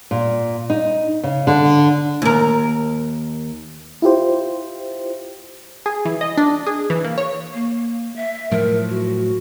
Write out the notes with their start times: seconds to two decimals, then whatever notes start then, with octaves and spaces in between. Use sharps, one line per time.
0.11 A#2
0.70 D#4
1.23 C#3
1.47 D3
2.22 D#2 A#4
4.02 E4 F4 G4 C5
5.86 G#4
6.05 E3
6.21 D#5
6.37 D4
6.66 G#4
6.90 E3
7.04 A#3
7.18 C#5
7.54 A#3
8.16 E5
8.51 A2 F3 F#3 A#4
8.89 F#4